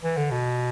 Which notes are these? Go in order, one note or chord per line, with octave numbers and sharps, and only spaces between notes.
E3
D3
B2